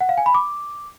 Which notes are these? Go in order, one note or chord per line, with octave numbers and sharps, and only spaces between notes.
F#5
F5
G#5
B5
D6